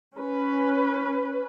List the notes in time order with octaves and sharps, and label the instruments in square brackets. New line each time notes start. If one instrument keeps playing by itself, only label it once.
[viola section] C#4 B4